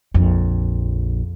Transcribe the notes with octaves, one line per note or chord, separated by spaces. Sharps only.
A#1 F2